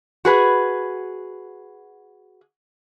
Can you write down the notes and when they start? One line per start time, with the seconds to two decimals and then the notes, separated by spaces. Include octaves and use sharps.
0.25 F#4 G#4 B4